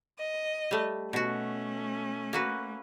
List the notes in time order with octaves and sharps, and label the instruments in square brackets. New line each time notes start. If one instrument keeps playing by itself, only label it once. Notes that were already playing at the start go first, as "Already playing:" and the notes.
[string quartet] D#5
[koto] G3 A3
[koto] B2 F#4 [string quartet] A3 C#4
[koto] A#3 F#4 B4